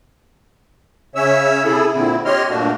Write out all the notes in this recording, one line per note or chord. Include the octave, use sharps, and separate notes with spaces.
C#3 C#4 C#5 E5 E6
C3 E4 G#4 A4
A#2 D3 C4 E4
G4 C#5 D#5 C6 F6
G2 A#2 A3 A#3 D4 F#4